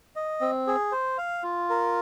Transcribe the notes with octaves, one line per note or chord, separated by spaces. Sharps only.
D#5
C4
G#4
C5
F5
F4
A#4